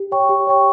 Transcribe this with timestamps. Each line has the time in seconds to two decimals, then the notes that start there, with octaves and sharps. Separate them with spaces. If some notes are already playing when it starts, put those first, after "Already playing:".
Already playing: G4
0.12 C#5 G5 C#6
0.29 G4
0.47 C#5 G5 C#6